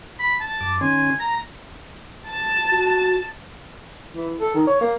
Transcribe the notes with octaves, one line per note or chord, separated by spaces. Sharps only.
B5
A5
F#2 D6
D#3 C#4 G#5 C6
A#5 A#6
A5
F#4
E3
A4
D#3
C#5
A#3